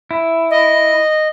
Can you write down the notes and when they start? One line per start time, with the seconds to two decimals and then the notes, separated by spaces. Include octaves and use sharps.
0.11 E4
0.50 D#5